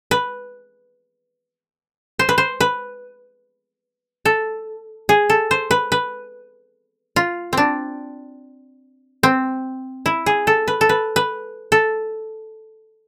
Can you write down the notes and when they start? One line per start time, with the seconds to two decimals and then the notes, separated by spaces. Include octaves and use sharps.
0.11 B4
2.19 C5
2.29 B4
2.38 C5
2.61 B4
4.25 A4
5.09 G#4
5.30 A4
5.51 C5
5.71 B4
5.92 B4
7.16 F4
7.53 C4 D4
9.23 C4
10.06 E4
10.26 G#4
10.47 A4
10.68 B4
10.81 A4
10.89 B4
11.16 B4
11.72 A4